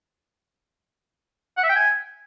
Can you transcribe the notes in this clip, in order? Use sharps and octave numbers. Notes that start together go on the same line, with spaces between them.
F#5
E5
G5
G#5